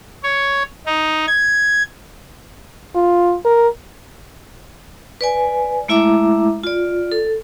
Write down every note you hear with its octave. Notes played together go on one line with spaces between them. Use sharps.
C#5
D#4
G#6
F4
A#4
B4 D5 G#5
G#3 A3 E4 E5 A#5 D6
F4 D5
A4